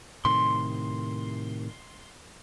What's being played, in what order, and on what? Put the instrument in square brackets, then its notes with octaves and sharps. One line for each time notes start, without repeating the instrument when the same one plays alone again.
[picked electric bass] A2 C3 D#3 [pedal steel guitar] C6